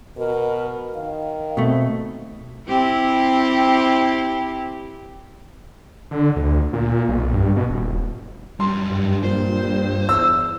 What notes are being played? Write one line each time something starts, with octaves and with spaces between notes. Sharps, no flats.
B2 A#4
D#3 F5
B2 A3 C4
C4 E4 G4
D3
D2
A#2
B1
G2
B2
D#1
F#2 G3 C6
G2
A#2 C5
E2 E6